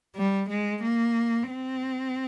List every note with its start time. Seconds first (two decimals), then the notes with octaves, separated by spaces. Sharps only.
0.16 G3
0.49 G#3
0.82 A#3
1.49 C4